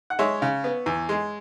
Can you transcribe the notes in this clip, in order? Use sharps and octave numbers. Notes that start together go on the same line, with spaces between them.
F#5
G#3 C#5 E5
C#3
B3
E2
G#3